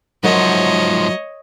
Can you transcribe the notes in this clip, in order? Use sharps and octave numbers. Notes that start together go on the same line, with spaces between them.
G#2 F3 F#3 A#4 C#5 D#5 E5